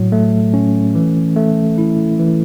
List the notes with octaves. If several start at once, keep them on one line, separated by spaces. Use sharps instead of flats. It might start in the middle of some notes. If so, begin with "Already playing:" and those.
Already playing: A2 F#3
A3
C#4
E3
A3
E4
E3